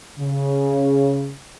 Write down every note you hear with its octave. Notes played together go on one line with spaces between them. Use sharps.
C#3